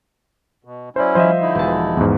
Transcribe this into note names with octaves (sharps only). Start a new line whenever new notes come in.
B2
F#3 C#4 E4 C5 D5
F3 C5 D#5 E5
D3 D#4 E4
E1 A5
E2 G#2